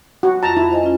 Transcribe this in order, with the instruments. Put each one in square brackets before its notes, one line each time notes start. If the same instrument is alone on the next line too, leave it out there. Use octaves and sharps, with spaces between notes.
[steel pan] F#4
[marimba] F2 F4 [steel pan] A5 A#5
[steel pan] E4
[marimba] C5 D#5 G#5
C#4 F4